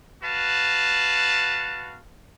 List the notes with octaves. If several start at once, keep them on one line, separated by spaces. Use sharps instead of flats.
F#4 B4 F5 A5